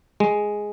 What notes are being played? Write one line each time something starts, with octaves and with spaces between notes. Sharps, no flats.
G#3